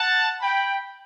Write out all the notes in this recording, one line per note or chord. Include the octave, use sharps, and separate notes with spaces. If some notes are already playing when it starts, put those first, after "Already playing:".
Already playing: F#5 A5
G5 B5